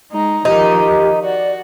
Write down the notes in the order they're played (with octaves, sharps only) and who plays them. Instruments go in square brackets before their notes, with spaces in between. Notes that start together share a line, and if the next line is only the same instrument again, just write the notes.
[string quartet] G#3 D#4 A#5
[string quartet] D#3 F3 [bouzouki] D#4 [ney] G4
[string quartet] F#4 [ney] D5